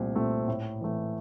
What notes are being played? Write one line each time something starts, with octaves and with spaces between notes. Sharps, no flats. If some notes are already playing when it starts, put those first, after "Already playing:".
Already playing: C2 A#2 A3 C4
A#2 A3 C4
A2
E3 A3